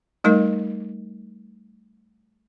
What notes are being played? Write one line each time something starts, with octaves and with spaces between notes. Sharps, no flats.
G3 A3 D#4 A#4 D#5